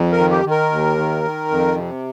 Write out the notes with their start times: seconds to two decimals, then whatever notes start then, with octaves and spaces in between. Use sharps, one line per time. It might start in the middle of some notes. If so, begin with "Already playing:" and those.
Already playing: F2
0.12 A#4
0.18 D#3
0.31 G4
0.45 D#3
0.51 A#4
0.72 D#2
0.98 D#3
1.24 D#3
1.51 F2
1.76 C3